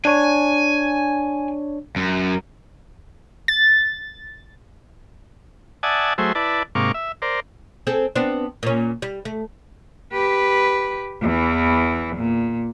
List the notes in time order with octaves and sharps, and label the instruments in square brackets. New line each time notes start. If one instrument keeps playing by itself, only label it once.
[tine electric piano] D4 C#5 [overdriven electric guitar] G#5
[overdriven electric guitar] F#2
[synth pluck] A6
[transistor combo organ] D5 E5 F#5 G#5 A5 D#6
F#3 A3 G#4 C5 E5
E4 B4 D5 A5
G#2 C3 A#3 F5 C#6 D6
E5
A#4 C5 D5
[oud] C4 G#4 A4
B3 C4 D4
A#2 C#4
G3
A3
[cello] G4 B4
E2 E3
A#2